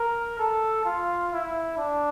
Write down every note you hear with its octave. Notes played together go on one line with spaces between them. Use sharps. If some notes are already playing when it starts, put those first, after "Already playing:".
Already playing: A#4
A4
F4
E4
D4